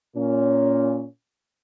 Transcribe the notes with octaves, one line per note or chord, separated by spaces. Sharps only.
A#2 C#4